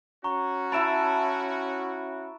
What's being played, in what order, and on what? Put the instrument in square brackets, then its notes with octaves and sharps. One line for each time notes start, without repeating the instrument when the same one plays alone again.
[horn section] C#4 F#4 [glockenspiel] A#5 C#6
[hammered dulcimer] E4 E5 A5 [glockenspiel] B5 D7 E7